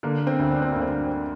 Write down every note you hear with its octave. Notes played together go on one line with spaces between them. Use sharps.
D3 A#3
C4
D2
D4
C4
D2 A#3
C4